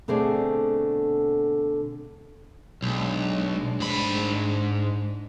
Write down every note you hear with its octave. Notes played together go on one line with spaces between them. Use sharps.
B2 D3 A3 C4 G#4 D5
B1 G#3 D4
G#2 B5